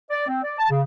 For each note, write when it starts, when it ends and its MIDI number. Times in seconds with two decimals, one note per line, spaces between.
0.11 0.25 74
0.27 0.40 60
0.43 0.54 74
0.59 0.67 81
0.70 0.81 49